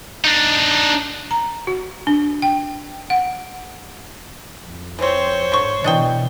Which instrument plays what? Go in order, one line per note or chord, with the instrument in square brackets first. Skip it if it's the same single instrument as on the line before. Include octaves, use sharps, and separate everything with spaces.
[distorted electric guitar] D4 D#4
[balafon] A#5
F#4
D4
G5
F#5
[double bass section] F2
[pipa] E3 C4 [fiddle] C5 C#5
[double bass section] G#2 [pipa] D3 C#6
[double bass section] B2 E3 [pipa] D4 D#5 G5